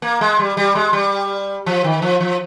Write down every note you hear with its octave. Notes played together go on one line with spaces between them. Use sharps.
A#3
G#3
G3
G3
G#3
G3
F3
D#3
F3
F3